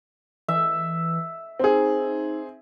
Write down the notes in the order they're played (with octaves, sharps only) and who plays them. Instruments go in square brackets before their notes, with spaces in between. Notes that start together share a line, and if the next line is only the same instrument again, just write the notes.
[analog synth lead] E3 [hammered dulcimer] E5
[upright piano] C4 G#4 [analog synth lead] D#4